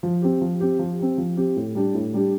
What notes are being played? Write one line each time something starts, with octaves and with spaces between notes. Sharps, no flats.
F3
C4 G4
F3
C4 G4
F3
C4 G4
F3
C4 G4
A2
G3 D4 G4
A2
G3 D4 G4